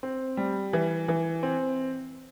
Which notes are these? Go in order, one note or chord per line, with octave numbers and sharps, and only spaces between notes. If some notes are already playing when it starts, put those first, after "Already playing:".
C4
G3
E3
E3
C4